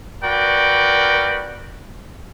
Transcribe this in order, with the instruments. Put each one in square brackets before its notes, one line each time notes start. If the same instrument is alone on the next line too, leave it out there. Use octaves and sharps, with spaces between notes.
[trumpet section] F#4 A#4 B4 D5 G5